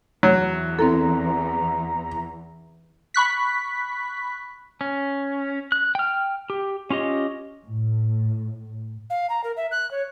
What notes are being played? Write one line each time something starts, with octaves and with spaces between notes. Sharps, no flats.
E2 E3 F#3
C4 E4 A4 A#5
B5 C#6 F#6 B6
C#4
F#6
G5 F6
G4
C#4 F4 G4 D#5
A2
F5
A#5
A#4
E5
F#6
C#5